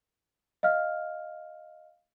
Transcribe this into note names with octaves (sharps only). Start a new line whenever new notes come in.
D#5 F5 F6